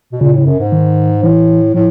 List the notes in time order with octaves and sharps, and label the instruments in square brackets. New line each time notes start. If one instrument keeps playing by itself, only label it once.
[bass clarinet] B2
[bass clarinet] A#2 [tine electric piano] C#3
[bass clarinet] A2 [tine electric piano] C#3
[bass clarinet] F#2
G#2
[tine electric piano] D#3
[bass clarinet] A2 [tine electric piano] E3
[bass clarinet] A2 [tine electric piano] F3